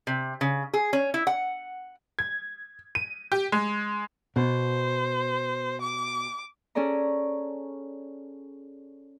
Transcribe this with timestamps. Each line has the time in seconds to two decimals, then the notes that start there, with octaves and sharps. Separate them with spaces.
0.07 C3
0.41 C#3
0.74 G#4
0.93 C#4
1.14 E4
1.27 F#5
2.19 G#6
2.95 D#7
3.32 G4
3.52 G#3
4.36 B2 C5
5.82 D6
6.75 C#4 G#4 A4 D5 A#5